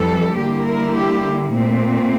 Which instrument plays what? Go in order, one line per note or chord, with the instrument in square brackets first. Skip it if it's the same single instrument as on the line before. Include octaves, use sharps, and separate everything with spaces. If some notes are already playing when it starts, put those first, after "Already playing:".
Already playing: [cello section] F2 E3 G3 A4
D3 G3 A#3 E4 G4
A#4
G4
A#2 A3 C4